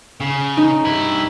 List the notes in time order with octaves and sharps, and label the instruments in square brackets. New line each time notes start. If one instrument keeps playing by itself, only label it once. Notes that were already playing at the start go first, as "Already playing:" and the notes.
[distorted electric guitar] C#3
[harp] D#4
[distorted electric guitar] G2 E4